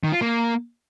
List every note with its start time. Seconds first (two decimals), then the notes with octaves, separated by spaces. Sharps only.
0.04 D#3
0.12 F4
0.21 A#3